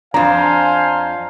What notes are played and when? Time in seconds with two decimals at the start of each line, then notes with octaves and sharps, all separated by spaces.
0.14 F2 D4 F4 C5 F5 G#5 A#5